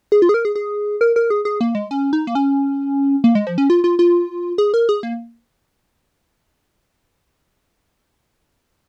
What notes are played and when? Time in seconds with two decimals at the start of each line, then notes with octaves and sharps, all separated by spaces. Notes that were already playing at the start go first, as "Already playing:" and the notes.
0.12 G#4
0.22 F4
0.29 G#4
0.34 A#4
0.45 G#4
0.56 G#4
1.01 A#4
1.16 A#4
1.30 G#4
1.45 G#4
1.61 A#3
1.75 G#3
1.91 C#4
2.13 D#4
2.27 A#3
2.35 C#4
3.24 A#3
3.35 G#3
3.47 F3
3.58 C#4
3.70 F4
3.84 F4
3.99 F4
4.58 G#4
4.74 A#4
4.89 G#4
5.03 A#3